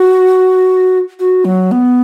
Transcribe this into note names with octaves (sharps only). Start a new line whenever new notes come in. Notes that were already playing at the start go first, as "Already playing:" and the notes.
Already playing: F#4
F#4
F#3
B3